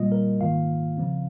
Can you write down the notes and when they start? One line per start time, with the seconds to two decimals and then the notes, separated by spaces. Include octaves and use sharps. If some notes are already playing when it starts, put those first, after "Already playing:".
Already playing: A#2 G3 A#3 F4 D#5
0.12 A#4
0.40 G#2 D#3 A#3 F4 F5
0.97 C#3 F3 C4